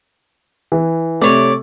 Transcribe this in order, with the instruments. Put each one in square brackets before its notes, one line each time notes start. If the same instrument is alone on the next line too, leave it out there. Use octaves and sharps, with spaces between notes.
[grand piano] E3
[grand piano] C3 A3 [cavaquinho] C#5 D5